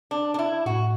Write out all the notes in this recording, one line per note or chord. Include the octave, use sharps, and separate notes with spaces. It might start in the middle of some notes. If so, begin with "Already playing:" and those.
D4
D4
E4
A2 F#4